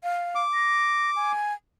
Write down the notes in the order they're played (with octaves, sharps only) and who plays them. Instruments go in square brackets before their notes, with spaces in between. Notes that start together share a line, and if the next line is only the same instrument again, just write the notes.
[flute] F5
[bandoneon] D6
[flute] A#6
G#5